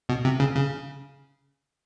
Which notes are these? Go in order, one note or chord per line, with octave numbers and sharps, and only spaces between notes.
B2
C3
C#3
C#3